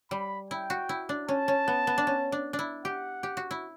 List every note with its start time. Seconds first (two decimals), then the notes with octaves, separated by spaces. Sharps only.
0.11 G3 B5
0.50 E4 G5
0.70 F#4
0.89 E4
1.09 D4
1.29 C#4 A5
1.48 C#4
1.68 B3
1.87 B3
1.98 D4
2.07 C#4
2.32 D4
2.53 D4
2.59 E4
2.85 G4 F#5
3.23 G4
3.37 F#4
3.51 E4